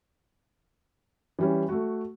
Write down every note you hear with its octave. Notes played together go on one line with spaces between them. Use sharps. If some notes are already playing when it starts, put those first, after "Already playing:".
E3 G3 C#4
A3 F#4